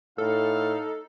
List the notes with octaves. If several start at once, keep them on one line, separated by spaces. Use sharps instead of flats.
A2 D#4 A4 F5